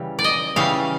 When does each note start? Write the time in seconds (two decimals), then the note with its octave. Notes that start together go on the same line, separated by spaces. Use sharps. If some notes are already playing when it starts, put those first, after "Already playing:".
Already playing: C#3 E3 G3
0.19 D5
0.24 D#5
0.56 C#3 E3 G3 F5